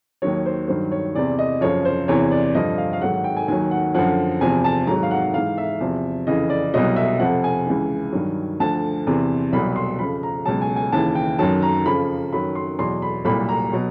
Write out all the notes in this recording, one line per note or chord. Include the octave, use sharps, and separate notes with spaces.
D#2 D#3 F#3 C#5
C5
G2 D#3 F#3 C5
C#5
E2 C3 E3 D5
D#5
F#2 C#3 F3 C#5
C5
E2 C3 E3 C#5
D5
G2 D3 F3 D#5
F5
F5
G#2 D#3 F#3 F#5
F#5
G5
G#5
D#2 D#3 F#3 G#5
F#5
F#2 D3 F3 F#5
E2 C3 F3 G#5
A5
G#2 D#3 F#3 A#5
F5
F#5
G#2 E3 F5
E5
E2 C3 F3
F2 C#3 E3 D#5
D5
C2 B2 F#3 D#5
E5
F2 C3 F3 F#5
G#5
C#2 C#3 E3
G2 D#3 F#3
D2 D3 F3 A5
E2 C3 E3
C2 B2 F#3 B5
C6
F2 C#3 F3 B5
A#5
C#2 B2 F#3 A5
G#5
G#5
D#2 C#3 E3 A5
G5
F#2 D#3 F#3 A5
A#5
F2 C#3 F3 B5
F#2 D#3 F#3 B5
C6
E2 B2 F#3 C6
B5
C2 A#2 F#3 B5
A#5
B2 F#3